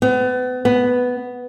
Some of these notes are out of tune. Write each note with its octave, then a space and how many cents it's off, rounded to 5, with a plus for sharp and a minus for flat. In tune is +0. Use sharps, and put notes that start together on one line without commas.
B3 +35
B3 +5